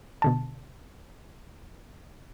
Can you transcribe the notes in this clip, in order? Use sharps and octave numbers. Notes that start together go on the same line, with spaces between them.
B2 D3 A5